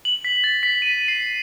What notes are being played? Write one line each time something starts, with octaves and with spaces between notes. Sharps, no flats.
F#7
B6
A6
B6
D#7
C7